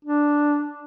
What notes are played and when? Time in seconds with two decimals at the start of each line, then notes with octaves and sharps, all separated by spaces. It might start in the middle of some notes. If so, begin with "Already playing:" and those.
0.05 D4